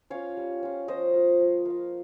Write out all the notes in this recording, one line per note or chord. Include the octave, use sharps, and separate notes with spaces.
C#4 F4 C#5 F5
G3
C#4 F4
F3 C5 D#5
A#3 F4
F3
A#3 F4